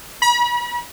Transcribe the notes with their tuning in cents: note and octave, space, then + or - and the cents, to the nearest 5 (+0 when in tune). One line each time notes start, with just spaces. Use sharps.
B5 -40